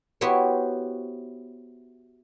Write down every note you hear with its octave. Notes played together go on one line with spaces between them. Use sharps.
B3 E4 F#4 G4 C5 C#5